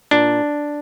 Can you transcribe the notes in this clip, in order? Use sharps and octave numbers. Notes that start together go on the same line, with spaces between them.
A#2 D4